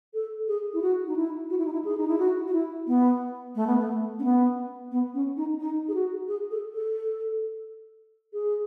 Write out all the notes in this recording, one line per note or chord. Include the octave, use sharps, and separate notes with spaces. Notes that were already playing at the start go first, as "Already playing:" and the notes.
A4
G#4
E4
F#4
D#4
E4
F#4
E4
D#4
E4
G#4
D#4
E4
F#4
F#4
E4
B3
A3
B3
A3
C#4
B3
B3
C#4
D#4
D#4
G#4
F#4
G#4
A4
A4
G#4